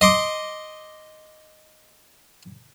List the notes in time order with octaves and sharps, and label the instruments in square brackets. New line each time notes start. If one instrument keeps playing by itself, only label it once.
[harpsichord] D#5 C6 D6